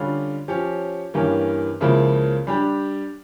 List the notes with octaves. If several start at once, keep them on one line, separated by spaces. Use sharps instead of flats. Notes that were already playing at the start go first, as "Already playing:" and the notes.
Already playing: D3 G3 C#4 F4
F3 C#4 G4 C#5
G2 E3 A#3 C#4 G4
C#2 C#3 F3 A#3 E4
G3 D4 G4